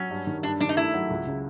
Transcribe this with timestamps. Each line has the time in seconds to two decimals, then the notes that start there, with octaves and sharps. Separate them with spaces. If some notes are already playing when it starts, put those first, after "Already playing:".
Already playing: F#3 C#4
0.11 G2
0.27 D#3
0.43 G2 D4
0.60 D#3 D4
0.69 D#4
0.77 A3 E4
0.94 F#3
1.10 C#2
1.27 C#3